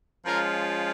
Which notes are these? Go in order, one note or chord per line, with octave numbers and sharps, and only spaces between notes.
F3 G#3 C#4 F4 A#4